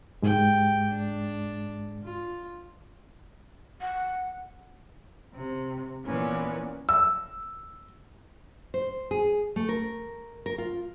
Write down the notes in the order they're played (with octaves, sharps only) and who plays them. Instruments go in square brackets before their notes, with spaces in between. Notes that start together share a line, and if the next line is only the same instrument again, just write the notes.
[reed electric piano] G#2 G#3 [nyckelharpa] G4 G5
[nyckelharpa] D4
F4
[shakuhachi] F#5
[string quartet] C3
A#2 E3 A#3 B3 C#4
[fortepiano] E6
[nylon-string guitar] C5
G#4
A3
A#4
A#4
F4